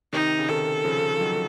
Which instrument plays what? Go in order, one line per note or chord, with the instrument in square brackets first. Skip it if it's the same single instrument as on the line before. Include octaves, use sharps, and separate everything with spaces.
[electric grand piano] C3 D#3 [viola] D#4
[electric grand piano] C#3
[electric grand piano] C3 D#3 [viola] A4
[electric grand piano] C#3 F3
F3
D#3 F#3